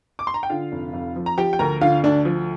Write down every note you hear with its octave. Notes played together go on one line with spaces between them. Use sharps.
D6
C6
A#5
G5
D3 F4 F5
F1
F2
F3
A#5
F3 G4 G5
G5
D2 A#4 A#5
D3 F4 F5
D2 D4 D5
F3